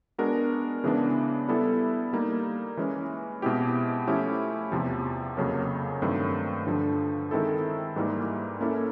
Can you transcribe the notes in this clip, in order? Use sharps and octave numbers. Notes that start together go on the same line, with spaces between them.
G#3 B3 D4 F#4 A#4
C#3 E3 G#3 B3 D4
G3 B3 E4 A4
G3 A#3 D#4
E3 G#3 C#4
B2 G#3 C4 E4 G4
F3 A3 C#4 E4 G4
E2 C3 F3
F2 C#3 F#3 A#3 C#4
G2 D#3 F#3 A3 C4
G2 D3 F3
D#3 G#3 C4 E4 A4
G#2 E3 G3 A#3 D#4
A#3 C#4 E4 A4